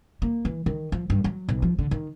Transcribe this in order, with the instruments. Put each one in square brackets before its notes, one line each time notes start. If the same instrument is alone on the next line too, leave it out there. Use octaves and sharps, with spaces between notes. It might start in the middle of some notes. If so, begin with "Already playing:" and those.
[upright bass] A#3
E3
D#3
F3
G2
F#3
B1
F3
D3
D#3